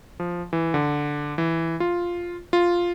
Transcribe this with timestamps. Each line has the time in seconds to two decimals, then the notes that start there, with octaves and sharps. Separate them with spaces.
0.20 F3
0.53 E3
0.74 D3
1.38 E3
1.80 F4
2.53 F4